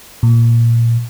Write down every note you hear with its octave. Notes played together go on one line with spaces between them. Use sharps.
A#2